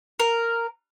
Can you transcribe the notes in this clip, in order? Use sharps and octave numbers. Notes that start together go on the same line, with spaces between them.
A#4